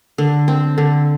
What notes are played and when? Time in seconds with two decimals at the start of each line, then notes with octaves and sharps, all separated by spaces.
0.18 D3
0.48 C4
0.78 D3